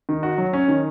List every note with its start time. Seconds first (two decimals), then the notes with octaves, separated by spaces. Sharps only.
0.09 D#3
0.23 F#4
0.38 F#3
0.53 C#4
0.68 D#3